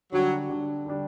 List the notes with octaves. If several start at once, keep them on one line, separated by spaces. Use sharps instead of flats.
D3 F#3 G3 D4
D3 G3 D4
D3 G3 D4